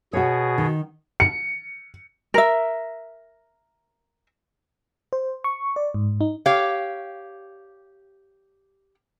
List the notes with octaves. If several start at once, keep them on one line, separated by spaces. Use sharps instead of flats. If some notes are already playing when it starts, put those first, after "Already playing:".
B2 F#4 G#4 C#5
D#3
C#7
A#4 E5
C5
C#6
D5
G#2
D#4
G4 C#5 F5